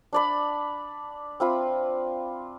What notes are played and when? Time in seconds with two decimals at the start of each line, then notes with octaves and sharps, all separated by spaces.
0.13 D4 D5 B5
1.40 C4 F4 B5